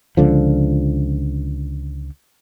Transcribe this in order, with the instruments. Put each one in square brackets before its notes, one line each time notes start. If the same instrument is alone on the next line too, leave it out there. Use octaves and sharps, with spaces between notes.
[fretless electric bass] C#2 D3 F3